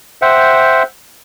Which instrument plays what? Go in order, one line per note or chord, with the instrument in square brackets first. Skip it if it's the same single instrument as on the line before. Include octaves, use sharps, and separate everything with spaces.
[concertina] C5 E5 F#5 G5